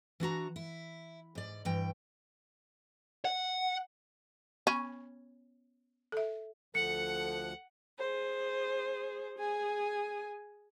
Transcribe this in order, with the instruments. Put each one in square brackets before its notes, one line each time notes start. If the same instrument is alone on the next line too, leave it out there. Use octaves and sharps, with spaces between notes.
[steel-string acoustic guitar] E3 D4 F#4 A#5
E4
G#2 D5
G2 E3 G5
[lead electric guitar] F#5
[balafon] B3 B5 C#6 [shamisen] C#4
[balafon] A4 E5
[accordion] D2 F3 F#6 [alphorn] A4 [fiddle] F#5 [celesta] C#7
[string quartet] G#4 C5
G#4 G#5